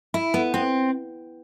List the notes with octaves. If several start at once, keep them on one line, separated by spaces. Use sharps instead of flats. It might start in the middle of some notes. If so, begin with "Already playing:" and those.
E4
B3
C4